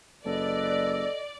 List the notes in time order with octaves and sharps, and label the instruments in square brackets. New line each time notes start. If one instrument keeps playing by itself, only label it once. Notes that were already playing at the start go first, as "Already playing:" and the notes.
[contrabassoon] F#1 [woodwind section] A4 B4 D#5 [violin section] D5